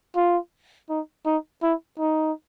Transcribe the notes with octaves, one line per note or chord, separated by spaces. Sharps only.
F4
D#4
D#4
E4
D#4